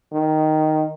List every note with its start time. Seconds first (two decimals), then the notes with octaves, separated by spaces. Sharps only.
0.13 D#3